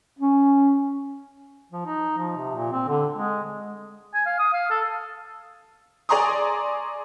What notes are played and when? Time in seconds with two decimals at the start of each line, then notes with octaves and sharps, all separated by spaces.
0.19 C#4
1.72 F3
1.86 D#4
2.18 F3
2.37 C3
2.55 A#2
2.72 C4
2.88 D3
3.15 G#3
4.14 G#5
4.26 F5
4.39 D#6
4.53 F5
4.71 A4
6.09 G#4 D5 A#5 C6 C#6 D#6